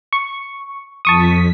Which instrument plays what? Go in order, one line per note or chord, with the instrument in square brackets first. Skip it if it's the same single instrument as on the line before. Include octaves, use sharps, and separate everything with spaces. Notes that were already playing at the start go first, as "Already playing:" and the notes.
[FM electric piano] C#6
[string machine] F2 B6 [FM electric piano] A5 C#6 D#6